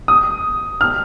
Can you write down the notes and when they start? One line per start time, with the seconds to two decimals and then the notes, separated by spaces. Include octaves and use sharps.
0.08 D#6
0.81 F6